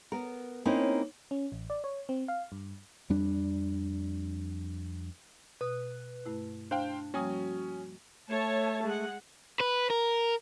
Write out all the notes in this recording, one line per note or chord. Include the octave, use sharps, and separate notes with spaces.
B3 A#4
A#3 C4 C#4 D#4 E4
C#4
A1
D5
C#5
C4
F5
G2
F2 G3 D4
B2 B4 D#6
G2 A3 E4
D4 C5 F5 G5
F3 G3 A#3 C#4 F#4 G#5 D#6
A3 C#5 A5
G#3 F#5
B4
A#4